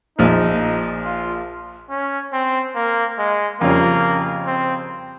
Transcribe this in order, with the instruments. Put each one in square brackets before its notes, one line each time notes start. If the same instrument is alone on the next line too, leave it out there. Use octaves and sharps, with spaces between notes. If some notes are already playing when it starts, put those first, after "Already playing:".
[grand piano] A#1 A#2 F3 [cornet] D#4
[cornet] F4
C#4
C4
A#3
G#3
[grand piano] F2 C#3 G3 C#4 F4 [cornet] A#3
[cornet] C4